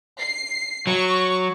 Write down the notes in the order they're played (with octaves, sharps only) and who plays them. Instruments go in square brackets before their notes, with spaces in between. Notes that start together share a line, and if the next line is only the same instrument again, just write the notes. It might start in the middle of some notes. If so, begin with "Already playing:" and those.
[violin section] C7
[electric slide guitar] F#3 [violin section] C#6